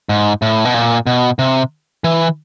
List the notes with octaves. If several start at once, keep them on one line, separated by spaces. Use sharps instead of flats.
G#2
A2
B2
A#2
B2
C3
E3